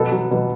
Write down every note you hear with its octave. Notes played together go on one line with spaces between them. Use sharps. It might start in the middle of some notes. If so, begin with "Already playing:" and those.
Already playing: B2 A4
F#3
B2